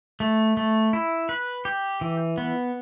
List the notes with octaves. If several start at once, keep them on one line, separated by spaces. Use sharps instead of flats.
A3
A3
E4
B4
G4
E3
B3